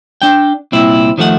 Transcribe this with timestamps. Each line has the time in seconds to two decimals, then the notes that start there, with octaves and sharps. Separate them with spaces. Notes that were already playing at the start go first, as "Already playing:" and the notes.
0.22 D4 G5
0.72 C2 A#2 C4 E4
1.18 D#3 F3 A3 G4 F#5